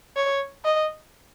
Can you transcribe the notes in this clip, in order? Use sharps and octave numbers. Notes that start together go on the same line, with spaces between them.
C#5
D#5